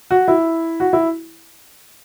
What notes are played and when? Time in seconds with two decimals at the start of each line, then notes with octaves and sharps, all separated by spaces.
0.11 F#4
0.28 E4
0.80 F#4
0.93 E4